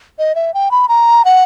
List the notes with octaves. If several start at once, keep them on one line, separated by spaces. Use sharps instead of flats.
D#5
E5
G5
B5
A#5
F#5